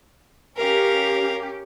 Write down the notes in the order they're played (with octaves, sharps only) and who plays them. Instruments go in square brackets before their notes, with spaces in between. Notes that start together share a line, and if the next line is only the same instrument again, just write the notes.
[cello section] C#4 G4 [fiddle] A#4 F5